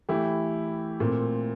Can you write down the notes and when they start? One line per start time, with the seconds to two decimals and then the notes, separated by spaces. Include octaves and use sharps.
0.09 E3 A3 E4 G4
1.00 A#2 A3 C4